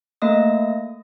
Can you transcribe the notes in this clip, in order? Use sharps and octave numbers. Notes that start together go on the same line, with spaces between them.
A3 A#3 D#5 D#6